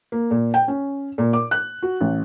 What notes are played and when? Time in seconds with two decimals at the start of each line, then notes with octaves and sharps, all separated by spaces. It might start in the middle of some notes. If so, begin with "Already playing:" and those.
0.12 A#3
0.31 A#2
0.54 G5
0.68 C#4
1.18 A#2
1.33 D6
1.51 F#6
1.83 F#4
2.01 A1